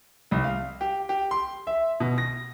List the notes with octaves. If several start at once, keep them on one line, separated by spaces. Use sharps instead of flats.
C2
F5
G4
G4
C6
E5
B2
A#6